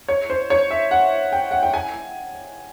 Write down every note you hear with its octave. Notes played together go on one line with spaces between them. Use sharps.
C#5
C5
C#5
E5
F#5
G5
F#5
G5
G#5